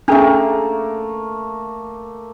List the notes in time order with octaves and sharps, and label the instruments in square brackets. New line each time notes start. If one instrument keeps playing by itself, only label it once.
[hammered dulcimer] A3 A#3 [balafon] C#4 G#4 E5 [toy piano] D4